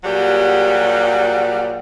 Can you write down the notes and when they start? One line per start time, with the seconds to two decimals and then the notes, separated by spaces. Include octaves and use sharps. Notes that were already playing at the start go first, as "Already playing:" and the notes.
0.04 A#2 F#3 G3 G4 G#4 F#5